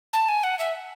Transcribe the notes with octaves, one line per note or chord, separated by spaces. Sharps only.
A5
G#5
F#5
E5